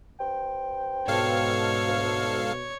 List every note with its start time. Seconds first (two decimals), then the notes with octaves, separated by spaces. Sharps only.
0.20 G2 C5 G5
1.08 G#2 B2 A4 C#5 F5
1.87 D2